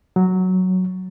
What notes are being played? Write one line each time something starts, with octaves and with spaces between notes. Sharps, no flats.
F#3